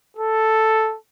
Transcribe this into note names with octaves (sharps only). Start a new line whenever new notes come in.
A4